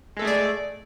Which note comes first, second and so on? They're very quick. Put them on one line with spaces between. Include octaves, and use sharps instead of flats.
G#3 A4 A3 G#4 D5